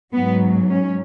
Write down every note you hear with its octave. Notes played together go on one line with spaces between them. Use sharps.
G#2 F#3 B3
C#4